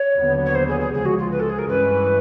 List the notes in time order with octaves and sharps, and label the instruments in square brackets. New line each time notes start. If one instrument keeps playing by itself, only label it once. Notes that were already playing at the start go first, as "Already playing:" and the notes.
Already playing: [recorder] C#5
[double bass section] D#2 D3 F#3 B3
[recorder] C#5
C5
G#4
G#4
[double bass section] C#2 C#3 F3 G#3 [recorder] G#4
[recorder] F#4
F4
B4
A4
G#4
A#4
[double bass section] G2 E3 G#3 C#4 [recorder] B4